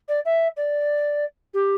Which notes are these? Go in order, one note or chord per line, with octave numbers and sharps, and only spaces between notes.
D5
E5
D5
G4